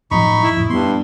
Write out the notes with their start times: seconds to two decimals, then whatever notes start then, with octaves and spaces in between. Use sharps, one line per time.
0.11 F#2 A2 F3 D#4 B5 C#6
0.43 E4
0.56 F2 A2
0.70 G2 G3 B3 C6